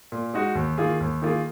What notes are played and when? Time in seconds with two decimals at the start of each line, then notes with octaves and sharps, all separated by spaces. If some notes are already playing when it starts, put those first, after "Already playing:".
0.12 A#2
0.34 G#3 D#4 F#4
0.55 D#2
0.78 D#3 A#3 F4 G#4
1.00 D#2
1.22 D#3 A#3 F4 G#4